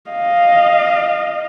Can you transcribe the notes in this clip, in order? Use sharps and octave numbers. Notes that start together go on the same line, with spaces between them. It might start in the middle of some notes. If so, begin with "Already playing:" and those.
D#5 F5